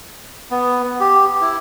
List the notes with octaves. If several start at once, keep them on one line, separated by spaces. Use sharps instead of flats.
B3
G4
E4